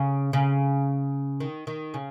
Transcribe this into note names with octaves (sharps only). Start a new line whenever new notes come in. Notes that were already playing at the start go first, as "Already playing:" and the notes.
Already playing: C#3
C#3
D#3
D#3
C#3